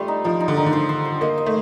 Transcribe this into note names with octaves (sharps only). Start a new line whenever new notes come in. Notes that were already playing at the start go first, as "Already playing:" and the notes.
Already playing: G3 A3 F4 C5
D#4
F3 D#4
D#4
D3
D#3 D#4
D3
C5
C5
C5
A#3 D#5
D#5
A3